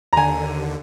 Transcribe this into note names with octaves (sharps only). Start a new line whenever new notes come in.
D#2 D3 G#5 A#5